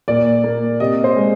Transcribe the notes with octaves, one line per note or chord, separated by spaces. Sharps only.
A#2 D5
A#3
C3 D#5
C5
G#3